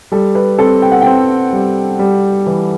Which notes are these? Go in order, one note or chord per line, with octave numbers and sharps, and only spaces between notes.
G3 A4
B4
C4 A4
G5
F#5
C4 G5
G3
G3
E3